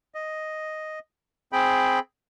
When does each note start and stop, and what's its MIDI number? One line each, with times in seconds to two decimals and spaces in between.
0.15 0.99 75
1.52 1.99 60
1.52 1.99 68
1.52 1.99 79
1.52 1.99 83